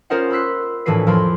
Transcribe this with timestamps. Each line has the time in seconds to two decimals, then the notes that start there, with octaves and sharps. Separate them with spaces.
0.10 C#4 F4 A#4 C5 D#5 F#5
0.30 B5 C6 E6 F#6 B6 C7
0.86 A#1 A2 E3 F#4 B4 C7
1.07 F2 F3 A#4 B5 C6